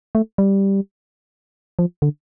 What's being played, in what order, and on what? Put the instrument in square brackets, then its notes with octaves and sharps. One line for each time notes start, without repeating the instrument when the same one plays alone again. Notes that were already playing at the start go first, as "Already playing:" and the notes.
[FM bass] A3
G3
F3
D3